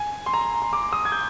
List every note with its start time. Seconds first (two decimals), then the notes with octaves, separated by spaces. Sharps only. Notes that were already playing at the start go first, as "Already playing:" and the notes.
Already playing: G#5
0.26 C6
0.34 A#5
0.62 C6
0.73 D6
0.93 D#6
1.05 G#6
1.12 G6